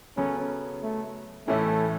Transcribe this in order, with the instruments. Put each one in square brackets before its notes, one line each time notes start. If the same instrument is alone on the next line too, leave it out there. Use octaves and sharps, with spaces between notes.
[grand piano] C#3 F#3 B3 A4 [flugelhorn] C#4
[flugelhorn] A3
[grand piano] A2 E3 C#4 E4 [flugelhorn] A3